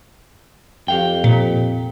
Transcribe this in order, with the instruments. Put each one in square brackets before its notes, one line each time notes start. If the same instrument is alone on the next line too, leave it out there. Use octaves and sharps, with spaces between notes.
[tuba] F2 [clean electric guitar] G4 F5 G5
[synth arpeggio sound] A#2